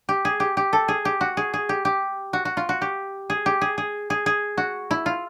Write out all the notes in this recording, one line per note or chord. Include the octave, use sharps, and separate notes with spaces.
G4
G#4
G4
G4
A4
G#4
G4
F#4
G#4
G#4
G4
G4
F#4
F#4
F4
F#4
G4
G#4
G4
G#4
G#4
G#4
G#4
F#4
E4
F4